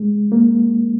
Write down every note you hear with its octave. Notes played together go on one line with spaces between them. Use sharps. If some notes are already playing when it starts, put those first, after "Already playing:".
Already playing: G#3
A#3